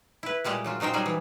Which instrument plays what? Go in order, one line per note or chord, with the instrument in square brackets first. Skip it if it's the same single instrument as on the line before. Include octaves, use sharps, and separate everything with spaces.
[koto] E4 B4
A#2 G3 G#3 G4
C#3 F#3 F4
C#3 F#3 D#4 C5 G5
F#3 G3 D#4 G#4
E3